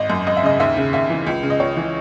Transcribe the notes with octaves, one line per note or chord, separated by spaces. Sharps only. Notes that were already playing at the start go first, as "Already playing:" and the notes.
Already playing: G#1 D#5
F#2
G#1 D#5
E5
C#3 D#5
D#2 E5
C#3
D#2 E5
E3
C#2
C#3
D#5
C#2 C#5
E3